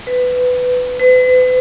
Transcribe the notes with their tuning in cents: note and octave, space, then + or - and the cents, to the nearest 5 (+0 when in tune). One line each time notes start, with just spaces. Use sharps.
B4 +15
B4 +40